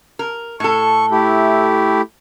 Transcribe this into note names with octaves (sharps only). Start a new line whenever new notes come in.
A#4
A2 A4 C#6
A3 E4 G4